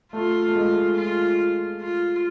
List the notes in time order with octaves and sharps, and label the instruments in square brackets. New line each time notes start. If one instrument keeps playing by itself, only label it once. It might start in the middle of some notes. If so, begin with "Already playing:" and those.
[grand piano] A3 [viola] F4
[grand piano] A3
G#3
[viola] F4
F4